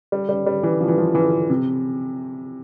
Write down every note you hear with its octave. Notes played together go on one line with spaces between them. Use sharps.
G3
G3
G3
E3
F3
E3
F3
E3
C3